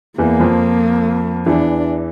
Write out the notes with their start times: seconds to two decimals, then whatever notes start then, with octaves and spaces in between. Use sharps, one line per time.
0.18 E2 E3 A#3
0.40 F2 F3
1.46 E2 E3 D4